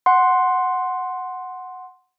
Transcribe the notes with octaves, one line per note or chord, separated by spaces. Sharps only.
F#5 C6